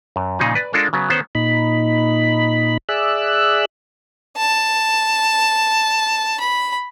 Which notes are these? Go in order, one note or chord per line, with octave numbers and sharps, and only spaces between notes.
F#2
A#2 C#3 F3 D#4 G#4
B4 D5
G#3 D4 F4 A4 A#4
C#3 F#3 B3
D#3 B3 C#4 C5
A#2 D#4 B5
G#4 D5 E5 E6 F#6
A5
B5